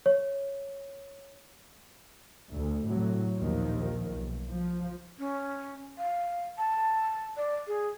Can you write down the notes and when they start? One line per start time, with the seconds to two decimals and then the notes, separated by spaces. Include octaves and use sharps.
0.06 C#5
2.51 D2
2.84 A2 C3 F#3
3.37 A#1 D#2 D#3 F3
4.06 B1
4.49 F3
5.19 C#4
5.98 F5
6.58 A5
7.37 D5
7.67 G#4